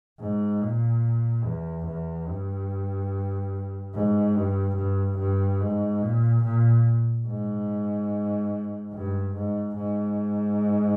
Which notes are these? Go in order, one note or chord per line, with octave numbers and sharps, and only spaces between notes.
G#2
A#2
E2
E2
G2
G#2
G2
G2
G2
G#2
A#2
A#2
G#2
G2
G#2
G#2